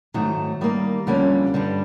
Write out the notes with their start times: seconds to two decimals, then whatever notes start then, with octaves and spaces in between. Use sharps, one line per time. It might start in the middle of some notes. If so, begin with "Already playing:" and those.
0.14 G#2 D#3 F#3 A3
0.61 D#3 G3 A#3
1.07 F2 D3 G3 A#3 C#4
1.54 G2 D3 G3